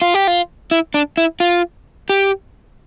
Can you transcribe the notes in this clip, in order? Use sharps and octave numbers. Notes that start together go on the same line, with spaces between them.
F4
G4
F4
E4
D4
E4
F4
G4